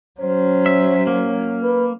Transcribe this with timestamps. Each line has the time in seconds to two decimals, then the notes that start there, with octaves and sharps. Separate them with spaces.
0.21 F#3 C#4 C5
0.66 E5
1.07 A#3
1.63 B4